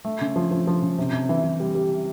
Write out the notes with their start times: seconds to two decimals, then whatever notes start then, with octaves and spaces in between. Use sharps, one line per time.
0.05 A3
0.21 C#3
0.36 F3
0.51 F3
0.67 F3
0.82 C#3
0.98 C3
1.13 C3
1.29 E3
1.44 E3
1.60 G3
1.75 G3